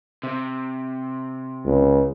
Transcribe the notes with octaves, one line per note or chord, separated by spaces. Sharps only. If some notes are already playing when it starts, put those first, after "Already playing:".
C3
C#2